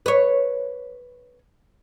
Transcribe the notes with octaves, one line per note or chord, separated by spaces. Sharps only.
B4 C#5